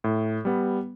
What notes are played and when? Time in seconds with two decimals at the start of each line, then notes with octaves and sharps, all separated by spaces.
0.04 A2
0.45 G3 B3